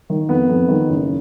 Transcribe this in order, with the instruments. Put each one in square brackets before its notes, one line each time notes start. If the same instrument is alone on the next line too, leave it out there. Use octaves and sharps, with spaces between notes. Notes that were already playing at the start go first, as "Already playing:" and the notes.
[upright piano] D#3
[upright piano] F2 [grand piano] B3
[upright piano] F2
D#3
F#1